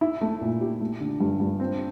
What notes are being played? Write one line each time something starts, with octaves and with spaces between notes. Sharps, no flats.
E4
A3
A#2
G4
A3
D3
G2
G2
C4